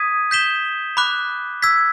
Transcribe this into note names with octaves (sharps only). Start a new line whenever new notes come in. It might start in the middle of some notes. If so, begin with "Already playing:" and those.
Already playing: D#6 G#6 B6 D#7
G6 B6 E7 G7
B5 D6 F#6
E6 G#6 B6